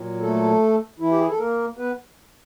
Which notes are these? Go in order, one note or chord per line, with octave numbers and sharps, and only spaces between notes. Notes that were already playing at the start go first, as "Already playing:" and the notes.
Already playing: A#2 F#3
A3 A4
E3 E4
G4
G#4
A4
A#3 A#4
B3 B4